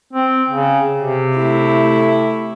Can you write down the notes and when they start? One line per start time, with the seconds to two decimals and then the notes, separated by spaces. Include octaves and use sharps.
0.13 C4
0.50 C#3
0.98 C3
1.38 A3 E4